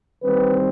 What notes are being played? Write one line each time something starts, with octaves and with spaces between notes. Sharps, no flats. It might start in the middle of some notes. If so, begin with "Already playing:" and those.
D#3 G3 C4 B4